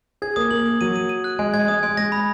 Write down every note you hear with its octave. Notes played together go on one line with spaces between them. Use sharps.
G#4 G#6
A#3 D#6
A#3 F#7
D#6
F#3 D#7
D#7
D#7
F#6
G#3 G#5
G#3 G#6
G#3 D#6
G#3 G#5
G#3 A#6
B5